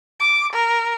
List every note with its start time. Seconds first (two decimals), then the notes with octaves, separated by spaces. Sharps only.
0.20 D6
0.53 A#4